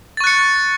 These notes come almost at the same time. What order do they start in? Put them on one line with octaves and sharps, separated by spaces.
A6 C#6 F#6 C#7